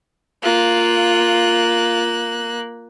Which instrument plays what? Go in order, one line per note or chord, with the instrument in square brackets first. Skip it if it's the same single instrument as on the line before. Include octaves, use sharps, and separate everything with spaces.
[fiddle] A#3 F#6 [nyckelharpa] F4